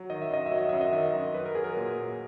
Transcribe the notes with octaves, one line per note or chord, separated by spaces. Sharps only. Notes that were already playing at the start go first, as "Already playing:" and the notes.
Already playing: F#3
D#3 D#5
E5
F#2 D#5
E5
F#3
D#5
F#2 E5
D#5
D#3 E5
D#5
F#2
F#3 B4
A#4
F#3 G#4
A#4
A#2
A#2